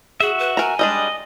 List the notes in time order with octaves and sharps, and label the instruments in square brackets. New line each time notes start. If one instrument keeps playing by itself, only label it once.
[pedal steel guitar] F#4 E5 [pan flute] G#4
[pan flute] B4
[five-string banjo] A#4 A#5 [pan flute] G#5
[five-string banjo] G3 G#3 D4 [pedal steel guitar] D#5